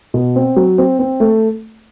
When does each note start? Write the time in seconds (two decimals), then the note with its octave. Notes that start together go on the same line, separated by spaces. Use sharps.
0.14 B2
0.36 C4
0.56 F#3
0.78 C4
0.99 C4
1.20 A3